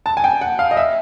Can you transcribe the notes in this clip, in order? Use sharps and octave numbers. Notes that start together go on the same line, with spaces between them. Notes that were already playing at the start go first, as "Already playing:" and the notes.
A5
G#5
G5
F#5
F5
D#5
E5